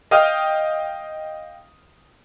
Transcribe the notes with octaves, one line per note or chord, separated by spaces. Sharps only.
D#5 F5 G5 D#6 F6